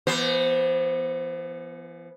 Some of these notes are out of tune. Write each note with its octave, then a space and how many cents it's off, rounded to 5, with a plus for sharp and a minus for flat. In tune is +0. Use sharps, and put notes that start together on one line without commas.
E3 +40 B3 -10 C5 +0